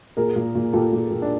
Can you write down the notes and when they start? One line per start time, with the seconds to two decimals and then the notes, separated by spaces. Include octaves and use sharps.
0.17 A#2 G#4 A#4
0.36 A#2
0.55 A#2
0.73 A#2 G4 A4
0.93 A#2
1.11 A#2
1.22 D4